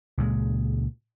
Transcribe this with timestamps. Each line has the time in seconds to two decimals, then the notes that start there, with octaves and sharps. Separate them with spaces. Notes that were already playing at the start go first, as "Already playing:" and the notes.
0.18 C#2 A#2 G#3